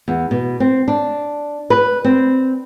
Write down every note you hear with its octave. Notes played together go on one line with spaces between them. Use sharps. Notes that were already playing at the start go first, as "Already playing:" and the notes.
E2
B2
C4
D4
B4
C4